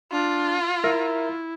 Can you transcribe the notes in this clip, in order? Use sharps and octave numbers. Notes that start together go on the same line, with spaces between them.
D4 F4
E4 A#4 E5 A#5